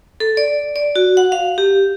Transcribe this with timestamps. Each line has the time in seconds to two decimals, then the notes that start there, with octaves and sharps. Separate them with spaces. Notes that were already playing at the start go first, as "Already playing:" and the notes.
0.20 A4
0.37 D5
0.76 D5
0.96 F#4
1.17 F#5
1.32 F5
1.58 G4